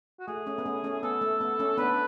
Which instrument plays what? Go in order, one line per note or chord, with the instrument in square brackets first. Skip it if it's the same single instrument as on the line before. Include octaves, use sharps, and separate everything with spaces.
[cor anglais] F#4
[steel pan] A3 [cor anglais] G#4
[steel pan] A3 C#4
B3
A3 C#4
A3 C#4
[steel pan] B3 [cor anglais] A4
[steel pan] A3
B3
A3 C#4
[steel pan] B3 D4 [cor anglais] B4